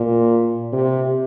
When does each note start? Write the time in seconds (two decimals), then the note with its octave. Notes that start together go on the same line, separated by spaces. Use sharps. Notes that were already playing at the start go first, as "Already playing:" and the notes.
Already playing: A#2
0.72 C3